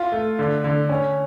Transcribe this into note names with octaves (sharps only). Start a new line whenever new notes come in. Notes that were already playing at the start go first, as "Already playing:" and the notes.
Already playing: F4
A3
D3
D3
C#4